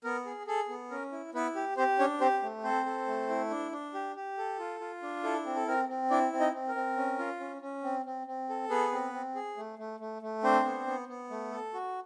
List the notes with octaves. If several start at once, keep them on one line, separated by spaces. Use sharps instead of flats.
B3 A#4
G#4
G#4 A4
B3
C#4 A#4
E4
B3 E4 B4
G4
C4 G4 C5
C#4 D4 C#5
C4 G4 C5
A3
C4 A4 C5
A4
A3
E4
D4
D4
G4
G4
A4
F4
F4
D4
E4 A4
C4
A4
C4 A#4
C4
D4 E4 D5
C4
D#4 D#5
C4
A#4
C4
C#4
F4
C#4
C#4
C4
C4
C4
A4
B3 G#4 B4
C4
C4
G#4
A3
A3
A3
A3
C4 D4 C5
B3
B3
B3
A3
A4
F#4